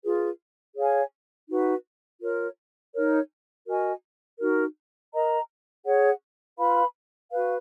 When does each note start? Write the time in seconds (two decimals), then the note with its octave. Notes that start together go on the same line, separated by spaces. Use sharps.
0.03 F4 G#4 B4
0.75 G#4 C#5 F5 G#5
1.48 D#4 F#4 B4
2.21 F4 A#4 C#5
2.94 D#4 A#4 C#5
3.67 F#4 A#4 D#5 G#5
4.39 D#4 F#4 A#4
5.12 A#4 D#5 A#5
5.85 G#4 C#5 F#5
6.57 F4 B4 F5 B5
7.30 F#4 B4 F5